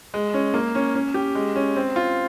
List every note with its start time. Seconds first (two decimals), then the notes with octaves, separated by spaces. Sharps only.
0.14 G#3
0.34 C#4
0.54 A#3
0.75 C#4
0.95 C#4
1.14 G4
1.35 G#3
1.56 C#4
1.76 C4
1.96 F4